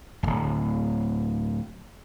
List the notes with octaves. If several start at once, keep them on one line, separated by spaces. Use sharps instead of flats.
D1 G#1